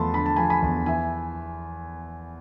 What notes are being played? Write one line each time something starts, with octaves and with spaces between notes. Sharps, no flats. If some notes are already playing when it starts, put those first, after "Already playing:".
Already playing: E2 F3 A3 A5 B5 C6
D3 B5
A5
F3 G#5 B5
G#5 B5
E2
E3 E5 G#5